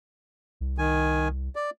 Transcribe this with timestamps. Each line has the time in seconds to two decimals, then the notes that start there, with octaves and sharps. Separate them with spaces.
0.61 C2
0.78 D#3 G#5
1.56 D5